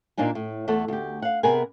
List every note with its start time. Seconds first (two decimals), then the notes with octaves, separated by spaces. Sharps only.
0.18 A#2 A#3 D4 D#4 G#5
0.35 A2
0.68 E2 A3 A4 F#5
0.88 D2 G4
1.22 F5 F#5
1.43 C3 B3 G#4 A#4 B4 G#5